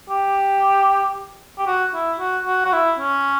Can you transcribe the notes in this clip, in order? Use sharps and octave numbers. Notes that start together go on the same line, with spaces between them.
G4
G4
F#4
E4
F#4
F#4
F#4
E4
C#4